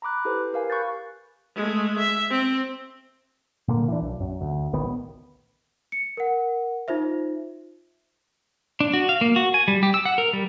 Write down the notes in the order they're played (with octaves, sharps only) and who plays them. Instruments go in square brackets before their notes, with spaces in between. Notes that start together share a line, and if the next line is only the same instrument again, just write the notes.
[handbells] A#5 B5 D6 F#6
E4 G4 A4 B4 C5
G4 A#4 F5 G#5
B5 C#6 F#6 G6 A6
[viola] G#3 A3
E5
C4
[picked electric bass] A#2 D3 A#3
E3 D4
B1
F#2
D2
A1 D2 D#3 B3
[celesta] C#7
A#4 F#5
D#4 F4 C5 E5
[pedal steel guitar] D4
F#4
F5
A#3
F#4
G#5
G3
G4
E6
F#5
A#4
G3